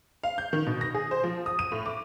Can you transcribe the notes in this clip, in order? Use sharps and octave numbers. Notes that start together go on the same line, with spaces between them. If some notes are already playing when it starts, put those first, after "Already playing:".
F5
G6
D#3
B2
A#6
G#4
C5
F3
D#6
D#7
A2
D6